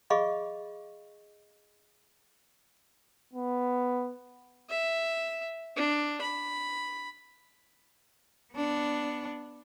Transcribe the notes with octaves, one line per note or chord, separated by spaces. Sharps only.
G#4 D#5 F5 B5 C#6
B3
E5
D4
B5
B3 D4